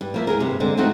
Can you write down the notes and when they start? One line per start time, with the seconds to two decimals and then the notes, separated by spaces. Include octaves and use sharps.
0.01 G2
0.14 F3 A#3 E5
0.27 E2 G#4 A#4
0.40 G2 C3
0.60 D3 G#3 A#3 C4
0.77 F3 A3 C4 D#4 F#4